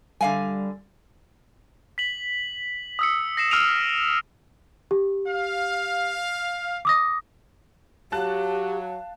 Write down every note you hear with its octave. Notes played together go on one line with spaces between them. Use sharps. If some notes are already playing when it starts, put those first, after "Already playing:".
D3 G3 F5 G#5
B6 F#7
D#6 E6 C#7
A#6 C7 E7
E6 F6 C7 D7 D#7 F7
G4
F5
D6 D#6 A#6
F#3 G4 F5 A5 F#6